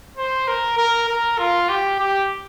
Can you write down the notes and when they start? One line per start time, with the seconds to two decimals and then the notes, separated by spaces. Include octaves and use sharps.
0.17 C5
0.47 A#4
0.77 A#4
1.09 A#4
1.38 F4
1.69 G4
1.99 G4